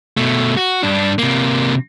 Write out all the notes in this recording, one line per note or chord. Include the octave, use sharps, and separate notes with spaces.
B2 A3
F#4
G2 D4
C3 A#3